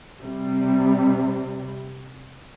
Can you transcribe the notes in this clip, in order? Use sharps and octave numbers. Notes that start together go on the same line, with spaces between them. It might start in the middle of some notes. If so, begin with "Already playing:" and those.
C3 G3